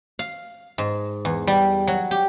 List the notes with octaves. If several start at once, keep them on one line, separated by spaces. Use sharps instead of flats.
F5
G#2
E2
G3
F#3
G4